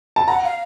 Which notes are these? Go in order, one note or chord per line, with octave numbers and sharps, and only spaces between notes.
A5
F#5 A#5
F5